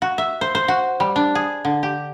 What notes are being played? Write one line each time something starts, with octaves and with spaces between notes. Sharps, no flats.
F#4
E5
C5
C5
F#4
G3
D4
G#4
D3
G4